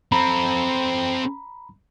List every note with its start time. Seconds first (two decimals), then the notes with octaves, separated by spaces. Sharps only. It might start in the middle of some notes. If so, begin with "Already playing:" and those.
0.12 C4 A4 A#5 B5